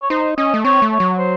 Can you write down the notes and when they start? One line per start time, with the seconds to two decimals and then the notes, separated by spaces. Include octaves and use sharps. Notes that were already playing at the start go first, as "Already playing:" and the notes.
0.02 C#5
0.10 D#4 C5
0.38 C#4 D#5
0.54 A3
0.64 C4 C#5
0.82 A3
0.92 C#5
1.00 F#3
1.18 C5